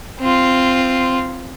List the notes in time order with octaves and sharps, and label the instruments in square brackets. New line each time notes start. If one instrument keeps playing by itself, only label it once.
[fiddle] C4 F4